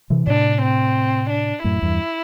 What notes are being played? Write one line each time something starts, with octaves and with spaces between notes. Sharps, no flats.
C3 E3
A2 C3 D4
C4
D4
F#2 A2 E4
E2 G2